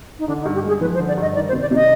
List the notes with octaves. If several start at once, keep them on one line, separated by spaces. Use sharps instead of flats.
D#4
D3 D4
D#4
G2
G4
G#3
G#4
F3 B4
C5
D3
D5
G2 D#5
D#3 D5
C5
C3
D5
C3 D#5